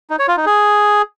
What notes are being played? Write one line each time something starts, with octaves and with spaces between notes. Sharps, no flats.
D#4
C#5
F4
D#4
G#4